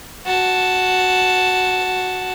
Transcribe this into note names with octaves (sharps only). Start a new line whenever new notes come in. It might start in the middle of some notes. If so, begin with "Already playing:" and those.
F#4 A5